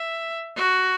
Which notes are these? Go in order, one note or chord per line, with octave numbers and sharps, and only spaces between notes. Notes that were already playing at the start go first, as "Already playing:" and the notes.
Already playing: E5
F#4